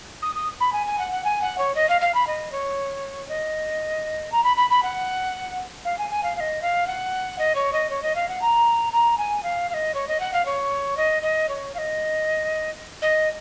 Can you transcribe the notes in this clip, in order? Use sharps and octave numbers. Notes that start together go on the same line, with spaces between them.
D#6
D#6
B5
G#5
G#5
F#5
F#5
G#5
F#5
C#5
D#5
F5
F5
B5
D#5
C#5
D#5
A#5
B5
B5
B5
F#5
F5
G#5
G#5
F5
F5
D#5
F5
F#5
D#5
C#5
D#5
C#5
D#5
F5
F#5
A#5
A#5
G#5
F5
F5
D#5
C#5
D#5
F#5
F5
C#5
D#5
D#5
C#5
F5
D#5
D#5